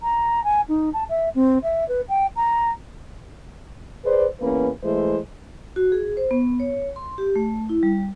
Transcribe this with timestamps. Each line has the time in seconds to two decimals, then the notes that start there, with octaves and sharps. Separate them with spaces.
0.01 A#5
0.44 G#5
0.68 D#4
0.93 A5
1.09 E5
1.35 C4
1.63 E5
1.88 B4
2.09 G5
2.36 A#5
4.04 G#4 B4 C5 D5
4.40 E2 A#3 C#4 B4
4.83 E3 G#3 A3 C5
5.76 F#4
5.92 G#4
6.17 C5
6.31 B3
6.60 C#5
6.96 C6
7.18 G4
7.36 A3
7.69 E4
7.83 G3